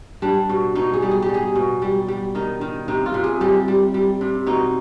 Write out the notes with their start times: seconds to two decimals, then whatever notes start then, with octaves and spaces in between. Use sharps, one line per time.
0.22 G3 D4
0.49 B2
0.75 B2 D#4
0.94 G#4
1.02 G3
1.11 G#4
1.22 G4
1.29 G3
1.34 G#4
1.55 B2
1.82 G3
2.08 G3
2.35 D#3 D#4
2.61 D#3
2.88 C3 D#4
3.06 F4
3.14 C3
3.24 G#4
3.41 G3 G4
3.68 G3
3.94 G3
4.21 C3
4.47 B2 D#4